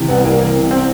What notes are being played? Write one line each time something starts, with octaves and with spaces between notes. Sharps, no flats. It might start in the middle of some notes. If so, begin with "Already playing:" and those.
Already playing: C3 E3
C2 B3
C2 A#3
E3 A#3
C3
C4